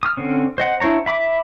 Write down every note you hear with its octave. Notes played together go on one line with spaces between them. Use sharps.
D#6 F6
D3 C4 C#4
C5 D#5 F#5
D4 E4 C5 C#5 A#5
E5 B5 D6